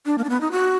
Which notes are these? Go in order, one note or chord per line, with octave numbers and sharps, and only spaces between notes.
D4
A#3
D4
B3
D#4
F#4